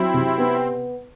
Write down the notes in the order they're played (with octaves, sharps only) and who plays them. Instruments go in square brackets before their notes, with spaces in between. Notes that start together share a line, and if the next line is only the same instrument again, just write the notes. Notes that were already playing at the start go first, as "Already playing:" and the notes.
Already playing: [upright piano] F#3 [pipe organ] C4 E4
[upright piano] C3
B3